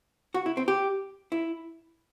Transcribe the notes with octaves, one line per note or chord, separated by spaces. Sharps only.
F#4
E4
C4
G4
E4